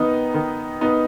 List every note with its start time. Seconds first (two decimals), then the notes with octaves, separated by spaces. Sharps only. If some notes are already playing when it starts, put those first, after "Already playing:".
Already playing: D#3 B3 D#4
0.34 D#3
0.81 B3 D#4